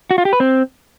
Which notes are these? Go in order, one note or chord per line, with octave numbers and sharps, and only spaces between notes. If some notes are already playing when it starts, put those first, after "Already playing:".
F#4
F4
G4
B4
C4